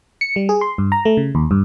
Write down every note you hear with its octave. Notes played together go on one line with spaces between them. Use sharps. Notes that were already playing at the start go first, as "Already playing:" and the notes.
C#7
G3
G#4
C6
G2
A#5
A3
C#3
D#2
G2